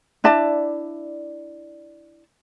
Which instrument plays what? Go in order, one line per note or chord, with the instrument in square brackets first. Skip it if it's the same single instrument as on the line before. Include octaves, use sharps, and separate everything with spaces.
[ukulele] D4 E4 D5 A5